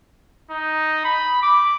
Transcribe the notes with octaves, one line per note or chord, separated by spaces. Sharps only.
D#4
B5
D6